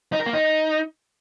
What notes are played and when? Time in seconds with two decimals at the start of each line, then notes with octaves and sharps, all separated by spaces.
0.12 D#4
0.19 A#4
0.26 A#3
0.33 D#4